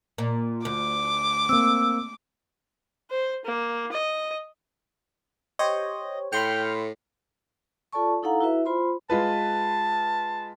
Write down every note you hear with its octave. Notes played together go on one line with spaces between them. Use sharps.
A#2
D2 D6
A#3 C4 E6
C5
A#3
D#5
G4 C5 C#5 D#5
A2 G5 B5 C6 F6 C#7
F4 A4 D5 A5 C#6
D#4 E4 A4 F5 F#5 A#5
E4 F#4 B4 E5
F4 C5 B5 C6
G#3 F4 B4 A5